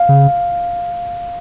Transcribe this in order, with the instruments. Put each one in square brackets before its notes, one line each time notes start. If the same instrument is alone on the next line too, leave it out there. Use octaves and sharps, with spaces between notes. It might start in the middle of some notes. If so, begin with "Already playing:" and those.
Already playing: [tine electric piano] F5
[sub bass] C#3